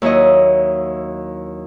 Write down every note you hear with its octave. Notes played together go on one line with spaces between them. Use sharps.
D#2 F#3 E4 C#5 D#5